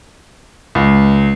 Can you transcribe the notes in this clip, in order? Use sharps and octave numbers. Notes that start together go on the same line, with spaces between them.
C#2